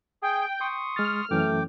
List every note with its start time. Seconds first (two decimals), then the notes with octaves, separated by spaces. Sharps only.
0.22 G#4 G5
0.60 C6 C#6 D#6
0.96 G#3 F6 A6
1.31 F#2 E3 A3 C#4 G5 D6